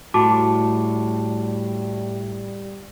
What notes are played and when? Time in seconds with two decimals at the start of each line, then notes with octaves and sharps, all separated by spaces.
0.14 A2 G3 F#4 A5 D6